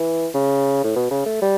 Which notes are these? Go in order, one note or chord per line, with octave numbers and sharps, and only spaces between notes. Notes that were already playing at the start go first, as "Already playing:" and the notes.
Already playing: E3
C#3
A2
B2
C#3
A3
G3